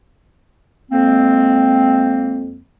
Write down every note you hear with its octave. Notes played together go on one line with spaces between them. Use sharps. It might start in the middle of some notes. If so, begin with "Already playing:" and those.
F2 G#3 A#3 C4